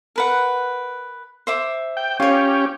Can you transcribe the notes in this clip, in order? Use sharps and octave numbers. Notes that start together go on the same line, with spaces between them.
A#4 B4 F#5
C5 E5 D6
G5
C#4 F4 G4 C#5